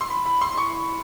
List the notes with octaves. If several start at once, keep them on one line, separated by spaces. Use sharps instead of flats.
C6
B5
B5
C6
C#6